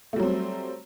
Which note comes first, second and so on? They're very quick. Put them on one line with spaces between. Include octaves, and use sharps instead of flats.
A3 G3 F#3 C4